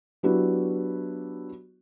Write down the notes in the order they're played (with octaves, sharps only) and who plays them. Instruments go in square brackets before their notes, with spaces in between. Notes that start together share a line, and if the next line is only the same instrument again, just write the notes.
[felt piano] F#3 B3 D4 E4 F#4 G4